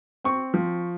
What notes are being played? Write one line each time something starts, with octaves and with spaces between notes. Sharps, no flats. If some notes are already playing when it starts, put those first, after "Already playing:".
C4 C#6
F3